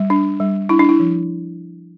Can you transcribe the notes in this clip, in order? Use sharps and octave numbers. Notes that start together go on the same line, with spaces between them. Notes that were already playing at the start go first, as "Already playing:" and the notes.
Already playing: G3
D4
G3
D4 E4
D4
E4
F3